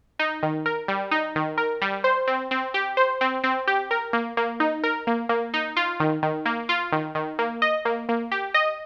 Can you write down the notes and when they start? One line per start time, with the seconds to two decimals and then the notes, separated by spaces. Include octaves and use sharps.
0.19 D#4
0.43 D#3
0.66 A#4
0.88 G3
1.11 D#4
1.36 D#3
1.58 A#4
1.82 G3
2.04 C5
2.27 C4
2.51 C4
2.74 G4
2.97 C5
3.21 C4
3.44 C4
3.67 G4
3.91 A#4
4.13 A#3
4.37 A#3
4.60 D#4
4.83 A#4
5.07 A#3
5.29 A#3
5.54 D#4
5.77 F4
6.00 D#3
6.23 D#3
6.46 A#3
6.69 F4
6.92 D#3
7.15 D#3
7.39 A#3
7.62 D#5
7.85 A#3
8.09 A#3
8.32 G4
8.54 D#5